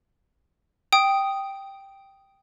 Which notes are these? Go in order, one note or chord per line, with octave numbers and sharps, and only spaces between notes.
G5 D#6